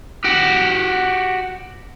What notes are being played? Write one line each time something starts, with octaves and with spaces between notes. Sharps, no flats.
F#4 G4